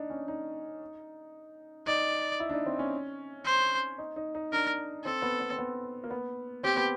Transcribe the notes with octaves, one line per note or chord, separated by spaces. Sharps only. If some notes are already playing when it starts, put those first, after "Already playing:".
Already playing: D4 D#4
C#4
D#4
D#4 D5
E4
D4
D#4
C4
C#4
C5
D#4
D#4
D#4
D4 A#4
C4 A4
B3
B3
C4
B3
A#3
B3
C4 G4
B3